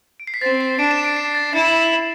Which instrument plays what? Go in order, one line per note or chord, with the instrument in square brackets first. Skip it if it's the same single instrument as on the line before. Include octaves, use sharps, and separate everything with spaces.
[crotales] D7
C7
B6
[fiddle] C4 [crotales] A6
[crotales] C7
[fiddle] D4 [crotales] D7
[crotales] E7
D7
C7
A6
[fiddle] E4 [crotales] A6